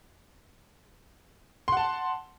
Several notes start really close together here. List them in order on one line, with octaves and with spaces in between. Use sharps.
C6 F#5 A5